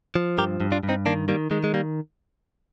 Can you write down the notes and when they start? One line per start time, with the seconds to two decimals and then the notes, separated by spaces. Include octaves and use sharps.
0.15 F3
0.38 G2 G4 A#4
0.60 G2
0.72 D4 F4
0.83 G2
0.89 C4 D#4
1.06 D#3 A#3 D4
1.28 D#3 G3 A#3
1.51 D#3 G#3
1.64 G#3
1.74 G3 A#3